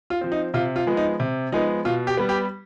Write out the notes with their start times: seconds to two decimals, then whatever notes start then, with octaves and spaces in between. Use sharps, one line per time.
0.10 F4
0.21 F3 C4
0.32 D#4
0.54 C3 F4
0.76 F4
0.87 F3 G#3 B3
0.97 D#4
1.20 C3
1.52 F3 G#3 B3 D#4
1.85 B2 F4
2.07 G4
2.17 G3 B3
2.29 G4